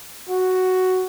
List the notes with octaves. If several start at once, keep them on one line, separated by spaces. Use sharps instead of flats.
F#4